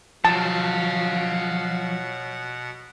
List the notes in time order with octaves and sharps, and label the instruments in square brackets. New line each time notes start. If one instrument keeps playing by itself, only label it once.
[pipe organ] B2 F#5 [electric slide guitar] F3 F#3 [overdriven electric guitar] C#5 F5 [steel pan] A5